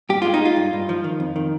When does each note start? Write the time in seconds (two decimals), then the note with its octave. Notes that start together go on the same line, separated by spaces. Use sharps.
0.09 G2 G4
0.22 G#3 F4
0.34 D#4
0.41 G#3 F4
0.56 G2
0.73 G2
0.89 F3
1.04 D#3
1.20 F2
1.36 D#3